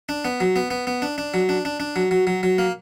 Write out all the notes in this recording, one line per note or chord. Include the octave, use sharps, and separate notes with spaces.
D4
B3
F#3
B3
B3
B3
D4
D4
F#3
D4
D4
D4
F#3
F#3
F#3
F#3
A#3